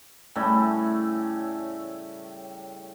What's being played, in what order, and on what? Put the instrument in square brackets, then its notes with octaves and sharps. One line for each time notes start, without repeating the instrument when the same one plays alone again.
[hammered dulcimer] A2 C#3 G3 A3